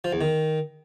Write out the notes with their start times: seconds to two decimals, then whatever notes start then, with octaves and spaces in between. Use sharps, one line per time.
0.04 F3
0.13 E2
0.21 D#3